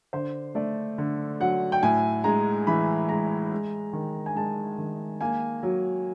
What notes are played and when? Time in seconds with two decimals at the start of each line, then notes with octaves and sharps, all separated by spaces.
0.13 D3 C5
0.55 A3 D5
0.98 D3
1.40 F#3 F#5
1.72 G5
1.83 A2 G#5
2.24 G#3 A#5
2.67 E3 B5
3.09 G#3 A#5
3.52 G#3
3.93 D#3
4.26 G#5
4.35 G#3 A5
4.78 D#3
5.21 A#3 G#5
5.63 F#3